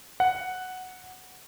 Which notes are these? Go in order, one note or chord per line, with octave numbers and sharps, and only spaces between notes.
F#5